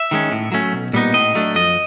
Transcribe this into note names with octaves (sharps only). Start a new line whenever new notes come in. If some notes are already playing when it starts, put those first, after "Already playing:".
Already playing: E5
D#3 G#3 C#4
A2
F#3 A3 C#4
B1
A#2 G3 B3 D#4
A2 D#5
F#3 A3 D4
F2 D#5